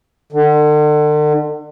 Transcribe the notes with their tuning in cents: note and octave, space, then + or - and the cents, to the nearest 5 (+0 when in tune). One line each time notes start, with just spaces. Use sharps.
D3 +40